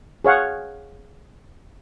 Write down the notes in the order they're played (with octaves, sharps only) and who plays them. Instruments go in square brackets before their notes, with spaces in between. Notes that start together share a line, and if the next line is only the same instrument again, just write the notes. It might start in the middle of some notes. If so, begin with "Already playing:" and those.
[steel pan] G#4 C#5 F5 F#5